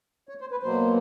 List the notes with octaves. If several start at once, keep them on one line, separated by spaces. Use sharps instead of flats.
C#5
C5
B4
B2 F#3 A#3 C5